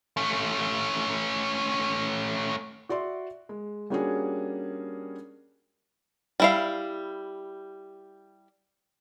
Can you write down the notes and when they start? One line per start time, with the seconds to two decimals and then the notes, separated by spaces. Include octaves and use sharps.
0.17 A3 C#4
2.89 F#4 D5 E5 C6
3.49 G#3
3.90 G3 A#3 C#4 D4 F#4 G#4
6.40 G3 E4 F5